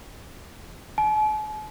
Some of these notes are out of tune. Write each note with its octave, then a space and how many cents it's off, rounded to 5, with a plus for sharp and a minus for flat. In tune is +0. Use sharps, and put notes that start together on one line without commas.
A5 -45